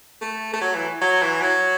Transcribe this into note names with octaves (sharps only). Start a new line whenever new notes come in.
A3
A3
F#3
E3
F#3
E3
F#3